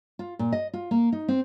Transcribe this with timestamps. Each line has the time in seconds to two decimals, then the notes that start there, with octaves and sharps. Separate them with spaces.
0.19 F4
0.39 A#2
0.52 D#5
0.74 F4
0.91 A#3
1.12 D#4
1.28 C4